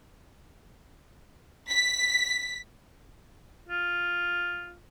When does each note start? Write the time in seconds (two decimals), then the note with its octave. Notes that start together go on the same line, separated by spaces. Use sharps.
1.70 B6
3.69 F4